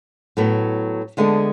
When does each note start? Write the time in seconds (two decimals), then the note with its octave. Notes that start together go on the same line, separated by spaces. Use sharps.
0.37 A2 F#3 B3
1.17 D2 D3 G#3 B3 D4